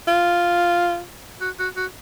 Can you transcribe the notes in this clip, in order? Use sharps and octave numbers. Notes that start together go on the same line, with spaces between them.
F4
F#4
F#4
F#4